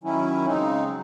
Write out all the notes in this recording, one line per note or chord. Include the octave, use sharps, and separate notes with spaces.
D#3 F#3 C#4 E4
C#3 G#3 C4 D#4
F#3